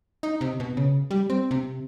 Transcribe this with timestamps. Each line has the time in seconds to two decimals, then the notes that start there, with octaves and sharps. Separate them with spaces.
0.23 D#4
0.41 C3
0.60 B2
0.77 C#3
1.11 G3
1.30 C4
1.51 C3